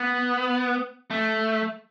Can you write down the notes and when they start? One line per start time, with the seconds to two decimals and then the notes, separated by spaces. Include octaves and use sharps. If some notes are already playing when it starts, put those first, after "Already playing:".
Already playing: B3
1.11 A3